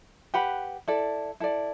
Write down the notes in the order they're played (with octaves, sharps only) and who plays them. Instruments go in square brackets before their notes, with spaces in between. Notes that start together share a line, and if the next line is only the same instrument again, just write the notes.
[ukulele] G4 B4 F#5 B5
E4 A4 D5
E4 A4 D5